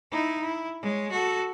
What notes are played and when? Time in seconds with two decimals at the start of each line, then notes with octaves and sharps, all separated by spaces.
0.12 D#4 E4
0.42 E4
0.82 G#3 C#5
1.11 F#4 A4